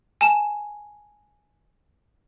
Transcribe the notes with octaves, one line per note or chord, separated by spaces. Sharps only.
G#5 A5 E7